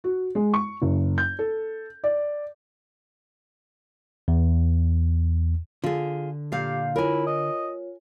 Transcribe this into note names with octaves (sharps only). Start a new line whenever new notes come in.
F#4
G#3
C#6
F#1
G6
A4
D5
E2
D3 F4 G#4
A#2 G4 F5 G6 C7
E4 F4 A#4 C#5 G#5
D#5